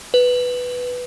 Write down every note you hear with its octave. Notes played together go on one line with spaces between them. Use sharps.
B4